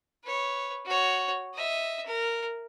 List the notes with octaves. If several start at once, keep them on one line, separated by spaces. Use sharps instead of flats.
B4 C#5
F#4 C#5
D#5 E5
A#4